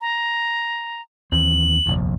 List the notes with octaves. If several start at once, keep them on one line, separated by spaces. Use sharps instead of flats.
A#5
D#2 E3 C4 F#7
F1 A#1 D#2